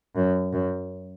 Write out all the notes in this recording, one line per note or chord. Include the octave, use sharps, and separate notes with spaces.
F#2
F#2